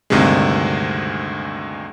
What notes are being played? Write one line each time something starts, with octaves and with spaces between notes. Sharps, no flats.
D2 G2 C3 D#3 G#3